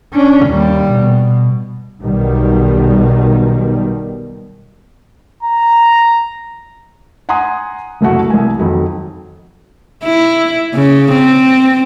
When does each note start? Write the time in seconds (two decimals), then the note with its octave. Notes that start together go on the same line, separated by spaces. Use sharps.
0.14 C#4 D4
0.47 D#2 G3
0.92 B2
2.01 B1 B2 D#3 G3
5.43 A#5
7.29 F#5 G#5 A#5 C6 D#6
8.01 F#1 C2 A3 F#4
8.30 C2 G#5
8.59 F2 D#3 F#3
10.05 E4
10.75 C#3
11.12 C4